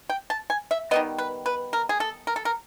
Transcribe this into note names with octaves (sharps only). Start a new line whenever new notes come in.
G5
A5
G#5
E5
D#3 G3 B3 D#5
B4
B4
A#4
G#4
A4
A#4
A4
A#4